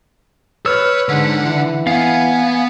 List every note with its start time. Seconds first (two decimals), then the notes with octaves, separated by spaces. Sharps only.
0.66 B4 C#5 E6 F6
1.09 G#2 D3 F#5
1.42 E3
1.87 B3 F5 F#5 G#5